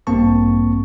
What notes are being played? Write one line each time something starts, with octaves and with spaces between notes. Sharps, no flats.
A1 G2 A#3 C4 A5 C#6